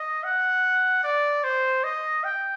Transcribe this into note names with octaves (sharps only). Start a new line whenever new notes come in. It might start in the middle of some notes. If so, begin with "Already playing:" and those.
Already playing: D#5
F#5
D5
C5
D#5
G5